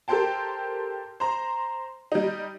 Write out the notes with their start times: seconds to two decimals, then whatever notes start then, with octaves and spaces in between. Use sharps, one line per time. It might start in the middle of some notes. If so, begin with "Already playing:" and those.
0.08 G4 A4 A#4 C5 G5 A5
1.20 C5 A#5
2.12 G3 D#4